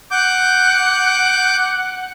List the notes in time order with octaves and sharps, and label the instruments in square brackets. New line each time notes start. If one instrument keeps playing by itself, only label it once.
[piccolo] F#5 [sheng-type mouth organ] D6 G6